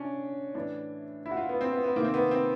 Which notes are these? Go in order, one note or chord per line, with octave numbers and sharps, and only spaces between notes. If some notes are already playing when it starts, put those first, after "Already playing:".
Already playing: C3 C#4 D4
A2 E3 D4
E4
F#4
F4
B3
C4
B3
B3
C3 D#3 A#3
C4
B3
C4